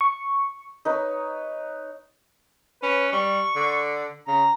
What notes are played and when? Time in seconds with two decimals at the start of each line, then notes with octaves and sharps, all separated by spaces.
0.01 C#6
0.85 D#4 B4 C#5
2.83 C#4 B4
3.13 G3 C#6
3.56 D3
4.27 C#3 A#5